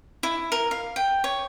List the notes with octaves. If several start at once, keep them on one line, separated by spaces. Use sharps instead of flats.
E4
A#4
F5
G5
C#5